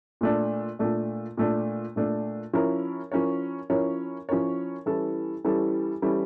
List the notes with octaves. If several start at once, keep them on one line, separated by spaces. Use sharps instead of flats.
A#2 A3 D4
A#2 A3 D4
A#2 A3 D4
A#2 A3 D4
F3 C#4 E4 A#4 C#5
F3 C#4 E4 A#4 C#5
F3 C#4 E4 A#4 C#5
F3 C#4 E4 A#4 C#5
E3 G3 C#4 E4 A4
E3 G3 C#4 E4 A4
E3 G3 C#4 E4 A4